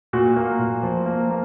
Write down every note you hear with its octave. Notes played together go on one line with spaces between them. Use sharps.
A#2 F#4
A#3
A#2
F3
A#3
A#3